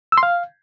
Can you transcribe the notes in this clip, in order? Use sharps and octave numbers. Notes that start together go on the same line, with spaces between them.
E6
C6
F5